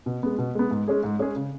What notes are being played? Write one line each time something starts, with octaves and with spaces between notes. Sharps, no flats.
B2
G#3 B3
B2
G#3 B3
G#2
G#3 C#4 G#4
G#2
G#3 C#4 G#4
C#3